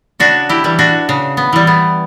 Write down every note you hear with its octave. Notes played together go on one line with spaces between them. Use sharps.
C#3 D4 F#4
E4 G4
E3 G3
D4 F#4
C#3
B3
E3 G3
B3